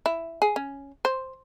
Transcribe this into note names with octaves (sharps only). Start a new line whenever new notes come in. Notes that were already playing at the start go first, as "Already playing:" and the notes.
E4
G#4
C#4
C5